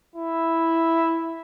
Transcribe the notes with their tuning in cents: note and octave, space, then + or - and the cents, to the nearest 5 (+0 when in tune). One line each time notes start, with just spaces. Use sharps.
E4 +0